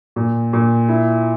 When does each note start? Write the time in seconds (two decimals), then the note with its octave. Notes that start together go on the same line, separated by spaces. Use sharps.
0.16 A#2
0.53 A#2
0.88 E4